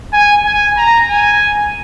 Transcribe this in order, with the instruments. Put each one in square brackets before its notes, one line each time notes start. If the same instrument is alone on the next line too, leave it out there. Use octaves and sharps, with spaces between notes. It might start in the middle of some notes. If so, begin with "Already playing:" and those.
[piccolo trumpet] G#5
G#5
A#5
G#5